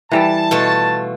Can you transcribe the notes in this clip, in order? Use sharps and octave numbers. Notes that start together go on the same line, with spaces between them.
E3 G3 A4 A5
B2 A3 F4